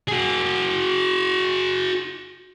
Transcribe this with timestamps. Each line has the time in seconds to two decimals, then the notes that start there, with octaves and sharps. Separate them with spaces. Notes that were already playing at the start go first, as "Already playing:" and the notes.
0.08 F#4 G#4